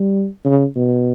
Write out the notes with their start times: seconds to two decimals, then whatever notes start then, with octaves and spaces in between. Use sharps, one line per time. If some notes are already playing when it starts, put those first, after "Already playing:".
Already playing: G3
0.45 C#3
0.76 B2